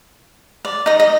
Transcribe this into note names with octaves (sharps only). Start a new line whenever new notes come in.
D5
D#4 D#5
D#5